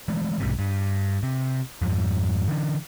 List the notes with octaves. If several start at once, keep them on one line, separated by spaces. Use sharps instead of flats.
E3 G#3 A3
B1 G#2 C3
G2
C3
F2 G#2
D3 E3 D4